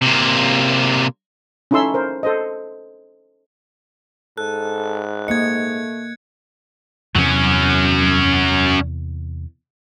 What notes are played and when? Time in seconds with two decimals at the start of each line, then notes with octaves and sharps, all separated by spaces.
0.02 C3 A#3
1.71 C#4 D#4 E4 A4 C6 E6
1.94 A#4 C5
2.23 A4 C5 D#5
4.38 G#2 A4 F#6
5.28 A3 A#3 D#5 G#6 C#7
7.15 E2 C3 F#3 C#4